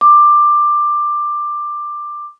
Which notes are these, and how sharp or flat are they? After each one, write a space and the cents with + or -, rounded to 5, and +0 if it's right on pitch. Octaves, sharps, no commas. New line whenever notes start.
D6 +15